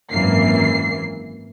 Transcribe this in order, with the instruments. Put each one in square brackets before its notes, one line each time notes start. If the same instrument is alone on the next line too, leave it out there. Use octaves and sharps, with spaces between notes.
[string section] G#1 F#2 E3 A#3 C7